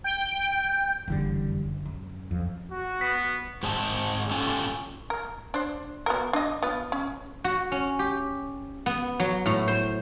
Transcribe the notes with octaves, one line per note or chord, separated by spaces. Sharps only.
G5
F#1 F2 D3 E3 G3
F#2
F2
F#4
B3 B6
G#2 G#3 C4 G#4 A5
C#4 F4 G4 A4 G#5
A#4
D4 C5
B3 F#4 A#4
D4 D#5
B3 F4
C#4
F#4
C#4
G4
B3
F#3
A2
C5